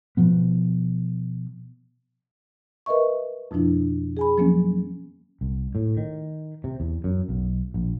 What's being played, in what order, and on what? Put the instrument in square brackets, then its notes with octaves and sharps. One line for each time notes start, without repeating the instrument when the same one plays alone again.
[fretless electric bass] B2 F3 B3
[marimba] A#4 B4 D#5 E5 C#6
F2 B2 F3 D4 E4
G#4 G#5 B5
F3 F#3 A#3 B3 C#4
[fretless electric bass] C2
A2
D#3
C3
E2
F#2
B1
A#1